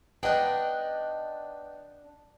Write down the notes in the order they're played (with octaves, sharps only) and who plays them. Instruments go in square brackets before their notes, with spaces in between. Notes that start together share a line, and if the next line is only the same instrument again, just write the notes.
[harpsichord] B3 D#4 [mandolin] D4 F#6 [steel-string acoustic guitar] D#5 G5